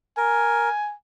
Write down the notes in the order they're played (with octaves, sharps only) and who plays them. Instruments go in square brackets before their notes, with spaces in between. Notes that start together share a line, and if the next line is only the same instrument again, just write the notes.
[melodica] A#4 [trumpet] G#5